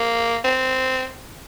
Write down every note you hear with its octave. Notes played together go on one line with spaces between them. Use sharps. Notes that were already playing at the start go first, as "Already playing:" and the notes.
Already playing: A#3
C4